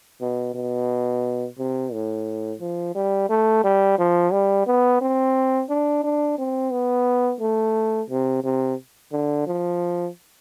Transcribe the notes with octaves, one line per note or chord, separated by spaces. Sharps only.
B2
B2
C3
A2
F3
G3
A3
G3
F3
G3
B3
C4
D4
D4
C4
B3
A3
C3
C3
D3
F3